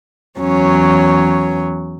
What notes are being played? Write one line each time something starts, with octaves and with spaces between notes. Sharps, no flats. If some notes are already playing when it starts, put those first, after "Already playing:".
E2 F#3 C#4